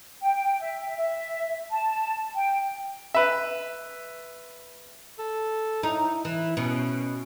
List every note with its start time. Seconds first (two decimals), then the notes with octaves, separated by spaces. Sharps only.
0.22 G5
0.61 E5
0.97 E5
1.70 A5
2.34 G5
3.15 B4 E5
5.19 A4
5.83 D#4 E4
6.25 E3 E4
6.57 B2 C#4